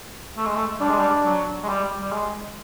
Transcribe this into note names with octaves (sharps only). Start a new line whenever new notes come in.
A3
G#3
A3
G3 D4
G#3
G3
F#3
G#3
G3
G3
G#3